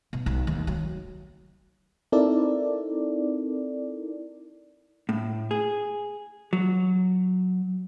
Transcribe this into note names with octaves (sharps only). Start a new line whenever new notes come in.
B2
B1
D#2
F#3
C4 D#4 E4 A4 A#4 D5
A2
G#4
F#3